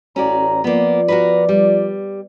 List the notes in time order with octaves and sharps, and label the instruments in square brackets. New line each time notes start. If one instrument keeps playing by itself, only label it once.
[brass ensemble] A1 A#5 [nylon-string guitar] C#4 F#4 D5
[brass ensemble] F3 F4 D5 [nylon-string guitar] A#3 B3
[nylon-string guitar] F#4 A#4 B4
G3